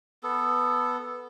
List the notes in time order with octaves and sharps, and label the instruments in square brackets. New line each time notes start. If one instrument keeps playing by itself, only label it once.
[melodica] B3 A4